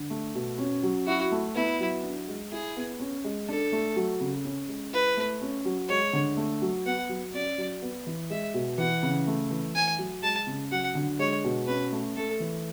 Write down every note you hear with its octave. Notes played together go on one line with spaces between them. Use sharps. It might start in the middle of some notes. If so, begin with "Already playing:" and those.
Already playing: D3
A3
B2
C#4
F#3
E4 F#4
A3
B3 E4
F#3
D4
G#3
E4 G#4
B3
C#4
G#3
D4 A4
A3
F#3
C#3
C#4
G#3
E4 B4
A3
C#4
F#3
G#3 C#5
D3
A3
F#3
B3 F#5
F#3
C#4 D5
F#3
B3
E3
G#3 E5
B2
E3 F#5
C#3
A3
E3
A3 G#5
F#3
G#3 A5
C#3
F#3 F#5
D3
G#3 C#5
B2
C#4 B4
A3
A3 A4
E3